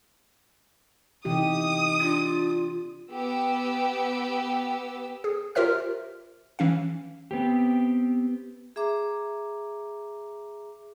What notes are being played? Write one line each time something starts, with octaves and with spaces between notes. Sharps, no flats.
C3 E3 D#4 G4 D#6
D4 F4
B3 G4 E6
G#4
F4 G4 A#4 C5 E5 F6
E3 C#4 F5
B3 C4 G4
G#4 E5 A#5 D6